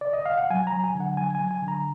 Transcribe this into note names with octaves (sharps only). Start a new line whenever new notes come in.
D5
D#5
F5
F#5
F#3 G#5
A#5
F#3
G#5
D3
F#5
F#3 G#5
G#5
F#3
G#5
D3
A#5